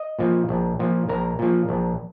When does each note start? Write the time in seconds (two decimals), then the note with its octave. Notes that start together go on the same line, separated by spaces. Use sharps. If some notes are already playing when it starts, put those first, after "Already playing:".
Already playing: D#5
0.19 A#2 F3
0.49 A#1
0.79 A#2 F3
1.09 A#1 A#4
1.39 A#2 F3
1.69 A#1